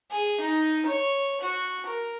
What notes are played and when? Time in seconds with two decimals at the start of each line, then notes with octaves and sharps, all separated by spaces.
0.11 G#4
0.41 D#4
0.86 C#5
1.41 F#4
1.86 A#4